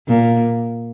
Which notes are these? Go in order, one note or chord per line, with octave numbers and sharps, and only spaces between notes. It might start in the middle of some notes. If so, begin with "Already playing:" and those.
A#2